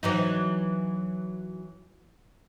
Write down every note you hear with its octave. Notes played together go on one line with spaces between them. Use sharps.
E3 F#3 D#4